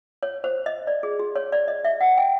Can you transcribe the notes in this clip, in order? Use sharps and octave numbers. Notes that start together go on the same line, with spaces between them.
C#5
C5
D#5
D5
G#4
G4
C#5
D5
D#5
E5
F#5
G5